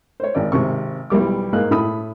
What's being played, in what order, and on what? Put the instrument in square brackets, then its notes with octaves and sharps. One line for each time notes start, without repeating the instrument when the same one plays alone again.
[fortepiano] C5 C#5
G#1 D5
G#1 C3 C#6
B1 E3 G3 D6
G#2 G#3 A#3 F5 F#6
A2 A4 B5 D#6